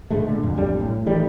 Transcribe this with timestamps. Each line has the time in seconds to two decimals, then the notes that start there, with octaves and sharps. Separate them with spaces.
0.11 G#2 D3 G#3 A3
0.27 A#2 D3
0.43 F2
0.56 A1 F2 G3 D4
0.79 A2
1.06 D#3 E3 G3 A3